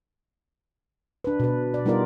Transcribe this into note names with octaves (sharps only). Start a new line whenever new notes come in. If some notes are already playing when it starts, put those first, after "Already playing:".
D4 B4
B2 B4
D5
G3 B3 D#4 F4 A#4 D5